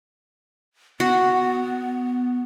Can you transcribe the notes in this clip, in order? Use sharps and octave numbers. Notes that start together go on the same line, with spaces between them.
B3 F#4